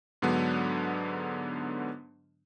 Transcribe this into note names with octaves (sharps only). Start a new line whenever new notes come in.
G#2 D3 F#3 B3 D4